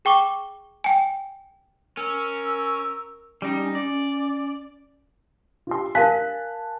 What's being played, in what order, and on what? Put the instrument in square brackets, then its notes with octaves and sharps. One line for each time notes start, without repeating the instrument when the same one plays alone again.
[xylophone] G#4 G5 C#6 D6 G7
G5 G#5
[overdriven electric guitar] C#4 [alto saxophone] A#4 [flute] E6
[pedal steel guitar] G3 D#4 [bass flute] C#4
[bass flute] C#4 [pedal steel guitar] D5
[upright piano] F4 G4 C6
[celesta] A#4 F5 B6 [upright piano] G#5 A5 F#6